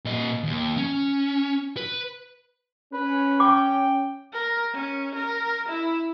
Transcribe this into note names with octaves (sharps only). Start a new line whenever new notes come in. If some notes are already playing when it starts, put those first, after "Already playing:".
A#2 D#5
D#2
C#4
B4
C#4 B4
G5 D6
A#4
C#4
A#4
E4